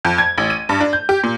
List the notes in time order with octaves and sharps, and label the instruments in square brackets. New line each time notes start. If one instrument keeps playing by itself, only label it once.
[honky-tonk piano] F2
G#6
A1
D#7
G2
D4
G6
G4
A#2